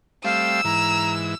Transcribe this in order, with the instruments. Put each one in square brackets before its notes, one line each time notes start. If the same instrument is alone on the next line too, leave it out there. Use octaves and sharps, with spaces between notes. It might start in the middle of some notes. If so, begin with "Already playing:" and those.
[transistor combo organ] G3 A3 C4 [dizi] F5 [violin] E6
[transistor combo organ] G#2 E3 [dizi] A#5